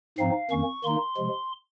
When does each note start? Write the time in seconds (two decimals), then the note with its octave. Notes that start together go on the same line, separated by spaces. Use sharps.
0.18 G#2 F3 C4 D#4 F5
0.51 F2 D#3 A#3 C#4 C#6
0.84 D#3 A#3 D#4 C6
1.17 C3 F3 G#3